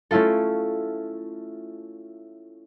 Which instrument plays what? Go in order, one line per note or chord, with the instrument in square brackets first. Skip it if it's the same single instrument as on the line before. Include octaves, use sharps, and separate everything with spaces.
[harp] A3 C#4 E4 F4 A4